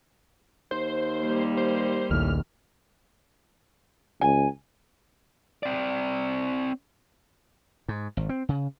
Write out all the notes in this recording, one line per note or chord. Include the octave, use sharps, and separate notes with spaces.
D#2 C5
G3 A#3
C5
A#1 D#2 A2 F6
C#2 G#5
C4 D5
G#2
G#1
C4
C#3